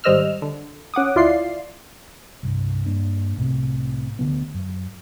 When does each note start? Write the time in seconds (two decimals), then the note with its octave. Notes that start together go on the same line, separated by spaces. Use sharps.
0.04 G#1 G3 C5 D#5 E6 F6
0.42 D3
0.94 C#4 F#5 D6 D#6
1.16 D2 E4 F4 D5 C6 C7
2.43 C2 G2
2.86 G2 A#3 D4
3.37 C2 A2 C3
4.19 D2 D3 D#3 B3
4.54 F#2